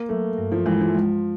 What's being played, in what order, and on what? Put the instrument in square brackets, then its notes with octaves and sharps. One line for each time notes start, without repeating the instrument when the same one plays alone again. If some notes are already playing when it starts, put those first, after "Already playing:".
Already playing: [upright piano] A#3
[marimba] F#3 [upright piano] A3
[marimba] G2
[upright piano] F3
[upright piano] E3 [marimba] G#3
[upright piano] F3
[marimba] G#3